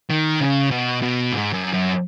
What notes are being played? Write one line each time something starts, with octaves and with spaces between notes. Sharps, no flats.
D#3
C#3
B2
B2
G#2
F#2
F#2